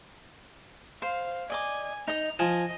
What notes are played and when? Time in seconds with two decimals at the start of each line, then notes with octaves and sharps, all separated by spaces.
1.02 C5 F5
1.50 D5 D#5 G#5 D6
2.08 D#4 D#5 F7
2.39 F3 D#5 G#5